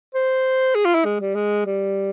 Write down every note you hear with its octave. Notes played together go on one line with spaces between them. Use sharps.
C5
G#4
F4
E4
G#3
G3
G#3
G3